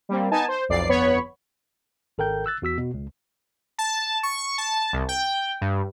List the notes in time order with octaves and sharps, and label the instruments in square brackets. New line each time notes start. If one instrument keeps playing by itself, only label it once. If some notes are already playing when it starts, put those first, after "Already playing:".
[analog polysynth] G3 A#3 C4
B3 D#4 G#5 A5
C5
B1 F2 D5 C7
G1 F2 B3 C#5 B5 C#6
[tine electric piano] G#1 A4 A#4 G5 G6
E6 F#6 A6
E2 F#4 E6 B6
B2
C#2
[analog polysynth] A5
C#6
A5
C2
G5
G2